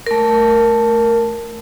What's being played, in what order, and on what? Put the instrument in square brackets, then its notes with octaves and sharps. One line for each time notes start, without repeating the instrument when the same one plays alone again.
[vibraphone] A3 A#4